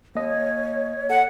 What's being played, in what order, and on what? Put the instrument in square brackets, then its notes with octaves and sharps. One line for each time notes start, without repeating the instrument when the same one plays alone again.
[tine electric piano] A#3 D#5 [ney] C#5
[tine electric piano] A4 [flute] F#5